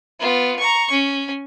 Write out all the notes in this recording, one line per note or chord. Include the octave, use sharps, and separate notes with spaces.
B3 F4
A#5 C#6
C#4